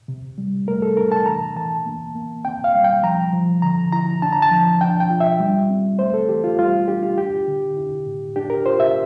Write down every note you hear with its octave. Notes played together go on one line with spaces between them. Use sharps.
C3
G3
A3 A#4
A4
D4 A#4
A5
E3 A#5
E3 A5
A#3
A#3
C4 G5
F5
G3
G5
F3 A#5
F3
D3 A#5
E4 A#5
D4 A5
A#5
A5
F3
D4 G5
G5
F4
E5
G3
C4
A3 C5
A4
E3 G4
F4
G3 F4
D4 G4
F4
D4 G4
D3
E4
A2
D4 G4
A#4
F4 C5
E5